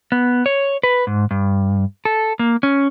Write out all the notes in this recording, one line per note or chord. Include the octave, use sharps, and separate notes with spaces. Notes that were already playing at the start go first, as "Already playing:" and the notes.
B3
C#5
B4
G#2
G2
A4
A#3
C#4